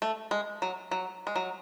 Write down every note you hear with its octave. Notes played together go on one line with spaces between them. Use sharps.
A3
G#3
F#3
F#3
G#3
F#3